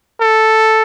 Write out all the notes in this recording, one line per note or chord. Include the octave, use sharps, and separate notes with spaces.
A4